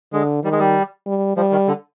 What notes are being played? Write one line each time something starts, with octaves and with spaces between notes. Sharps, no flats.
D3 G#3
D#3 G3
G#3
G3
G3
F3 G3
D#3
D3